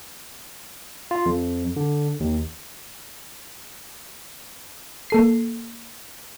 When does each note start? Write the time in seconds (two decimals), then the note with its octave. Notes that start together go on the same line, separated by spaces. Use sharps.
1.11 F4
1.26 F2
1.76 D3
2.20 D#2
5.10 A#3 A4 C7